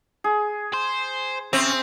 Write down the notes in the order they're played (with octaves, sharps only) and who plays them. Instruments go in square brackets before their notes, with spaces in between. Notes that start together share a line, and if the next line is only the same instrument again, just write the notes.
[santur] G#4
[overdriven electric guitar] C5
[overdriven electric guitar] C#3 [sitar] C4 [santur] E5